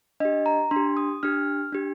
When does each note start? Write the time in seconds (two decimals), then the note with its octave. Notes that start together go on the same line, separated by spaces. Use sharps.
0.20 D4 G4 D#5
0.46 A#5
0.71 D4 C6
0.76 G4
0.97 D#6
1.23 D4 G4 F6
1.73 D4 G4